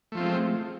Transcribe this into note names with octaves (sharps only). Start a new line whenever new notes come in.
F3 G#3 A3 C4 F4